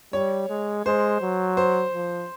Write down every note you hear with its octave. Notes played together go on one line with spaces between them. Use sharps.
G3 C#5
G#3
G#3 C5
F#3
C5
F3